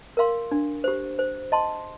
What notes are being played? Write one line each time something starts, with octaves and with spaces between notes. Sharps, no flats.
A#4 F5 C6
D4
G4 C5
C5
D#5 A5 C6